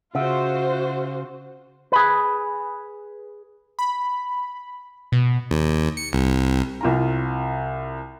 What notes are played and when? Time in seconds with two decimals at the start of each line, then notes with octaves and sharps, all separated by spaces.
0.15 C#3 F4 F#4 C5 E5 F#5 E6
1.92 G#4 B4
3.79 B5
5.12 B2
5.51 D#2
5.97 C#7
6.13 C2
6.81 C2 F4 A#5